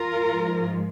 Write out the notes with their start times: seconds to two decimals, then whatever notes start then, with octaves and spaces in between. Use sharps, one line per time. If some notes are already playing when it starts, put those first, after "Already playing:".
Already playing: F4 A#4
0.23 G#2 F3 G#3